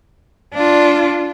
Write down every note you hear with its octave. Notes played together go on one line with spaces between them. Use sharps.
D4 F4